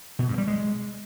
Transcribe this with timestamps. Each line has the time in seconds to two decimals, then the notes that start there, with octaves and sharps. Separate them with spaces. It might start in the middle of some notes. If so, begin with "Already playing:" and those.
0.19 B2
0.28 G2
0.38 G3
0.47 G#3